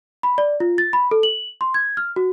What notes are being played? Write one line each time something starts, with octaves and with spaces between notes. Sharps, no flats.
B5
D5
F4
A6
B5
A4
F#7
C6
G#6
F6
F#4